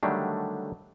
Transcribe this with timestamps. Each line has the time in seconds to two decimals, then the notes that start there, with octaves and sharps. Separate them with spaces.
0.03 D3 D#3 F#3 G3 A3 D4